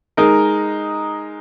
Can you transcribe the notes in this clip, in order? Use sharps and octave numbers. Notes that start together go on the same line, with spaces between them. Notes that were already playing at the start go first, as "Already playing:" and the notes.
G#3 D#4 A#4